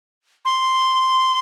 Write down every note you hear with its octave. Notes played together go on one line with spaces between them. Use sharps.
C6